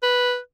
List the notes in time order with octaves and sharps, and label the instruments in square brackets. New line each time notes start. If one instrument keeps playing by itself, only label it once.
[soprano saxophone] B4